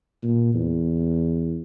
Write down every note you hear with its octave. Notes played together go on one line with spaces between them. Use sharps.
A#2
E2